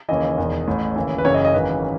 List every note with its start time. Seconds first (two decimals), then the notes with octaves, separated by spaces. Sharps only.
0.09 D#2 C#3 E3 D#5
0.38 E1 E2 D#3
0.67 A1 A2 E3
0.96 D#2 C#3 E3
1.18 B4
1.25 F#1 F#2 C#3 E3 C#5
1.34 D#5
1.45 D#5
1.53 G#1 F#2 C#3 E3 B4